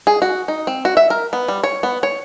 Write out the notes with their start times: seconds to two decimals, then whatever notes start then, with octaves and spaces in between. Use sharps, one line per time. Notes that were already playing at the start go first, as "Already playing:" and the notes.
0.07 G#4
0.22 F#4
0.48 D#4
0.67 C4
0.85 F#4
0.97 E5
1.10 A#4
1.33 B3
1.48 G3
1.64 C#5
1.83 B3
2.03 C#5